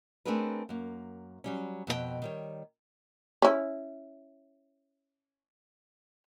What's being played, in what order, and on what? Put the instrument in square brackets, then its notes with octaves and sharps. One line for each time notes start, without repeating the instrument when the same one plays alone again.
[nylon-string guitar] A3 C4 D4 G#4 A#4 B4
F#2 A#3
F#3 G3 C#4
F2 B2 G4 G5
D#3 G3 C#5
[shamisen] C#4 E4